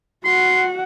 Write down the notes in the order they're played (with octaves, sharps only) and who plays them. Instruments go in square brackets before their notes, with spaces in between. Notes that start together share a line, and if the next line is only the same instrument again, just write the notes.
[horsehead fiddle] F#4 F#5 [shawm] C6